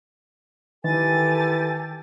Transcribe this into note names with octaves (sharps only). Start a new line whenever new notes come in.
D#3 E3 G4 A4 G#5 A6